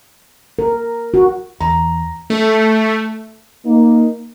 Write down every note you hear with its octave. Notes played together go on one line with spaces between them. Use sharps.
A#4
F#4
E2 A#5
A3
A#3 D#4